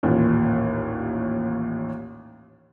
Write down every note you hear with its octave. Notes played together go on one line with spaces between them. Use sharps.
A1 D#2 A#2